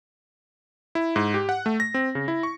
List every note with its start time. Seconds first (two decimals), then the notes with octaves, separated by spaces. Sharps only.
0.95 E4
1.16 G#2
1.34 G4
1.49 F#5
1.66 A3
1.80 A#6
1.94 C4
2.15 C#3
2.28 E4
2.43 C#6